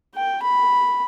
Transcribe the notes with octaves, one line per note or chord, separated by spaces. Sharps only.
G5
B5